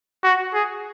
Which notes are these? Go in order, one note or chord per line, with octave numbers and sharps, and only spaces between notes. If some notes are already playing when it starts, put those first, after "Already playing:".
F#4
G#4